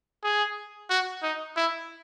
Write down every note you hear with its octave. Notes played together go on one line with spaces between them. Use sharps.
G#4
F#4
D#4
E4